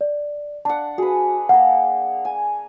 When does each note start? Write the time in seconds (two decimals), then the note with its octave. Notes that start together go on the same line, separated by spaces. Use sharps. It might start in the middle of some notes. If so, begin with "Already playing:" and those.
0.01 D5
0.65 D4 F#5 A5
0.98 F#4 G#4 B4
1.49 A#3 A#4 F#5
2.25 G#5